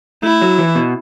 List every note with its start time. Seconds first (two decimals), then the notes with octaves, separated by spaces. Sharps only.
0.23 A3 E4
0.42 F#3
0.58 E3
0.75 B2